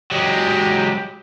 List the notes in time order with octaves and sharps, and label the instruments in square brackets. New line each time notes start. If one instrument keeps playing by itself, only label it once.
[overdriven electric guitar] F#3 G#3 [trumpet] G4